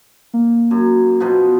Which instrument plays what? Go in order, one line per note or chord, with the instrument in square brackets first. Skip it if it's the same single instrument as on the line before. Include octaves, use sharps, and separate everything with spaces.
[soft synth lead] A#3
[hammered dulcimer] F#2
B2 F3 B3